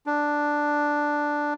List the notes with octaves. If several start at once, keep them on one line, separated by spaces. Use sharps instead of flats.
D4